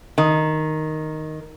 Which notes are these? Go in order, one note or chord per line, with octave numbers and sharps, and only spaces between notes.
D#3